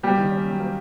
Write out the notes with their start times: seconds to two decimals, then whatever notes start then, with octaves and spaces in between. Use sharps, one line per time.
0.03 G3 A#3 G4
0.17 D#3
0.31 C#4
0.46 F#3
0.60 A#3